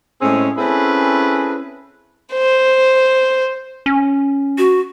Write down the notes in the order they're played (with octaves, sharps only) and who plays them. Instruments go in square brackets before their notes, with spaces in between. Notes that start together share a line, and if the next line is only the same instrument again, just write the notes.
[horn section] A2 G#3 C4 C#4 G#4
C4 C#4 E4 G#4 A4 B4
[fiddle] C5
[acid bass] C#4
[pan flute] F#4